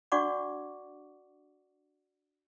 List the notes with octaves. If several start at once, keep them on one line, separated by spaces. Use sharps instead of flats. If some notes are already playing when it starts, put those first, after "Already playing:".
D4 F#4 D5 F#5 C#6 D6